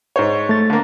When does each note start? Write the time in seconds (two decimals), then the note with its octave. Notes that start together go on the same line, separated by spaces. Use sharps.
0.16 G#2 C5 C#5
0.49 A3 A6
0.70 D3 A#3